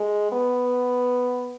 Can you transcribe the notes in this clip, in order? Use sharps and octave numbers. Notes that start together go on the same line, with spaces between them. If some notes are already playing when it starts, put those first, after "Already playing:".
Already playing: G#3
B3